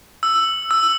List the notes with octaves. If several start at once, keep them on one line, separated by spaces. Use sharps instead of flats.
E6
E6